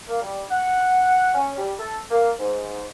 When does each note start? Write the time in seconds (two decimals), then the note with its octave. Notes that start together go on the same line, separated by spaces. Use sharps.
0.09 A#3
0.21 G3
0.51 F#5
1.34 C#4
1.57 G3
1.79 A4
2.11 A#3
2.39 G#2